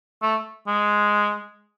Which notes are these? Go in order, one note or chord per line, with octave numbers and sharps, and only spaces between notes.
A3
G#3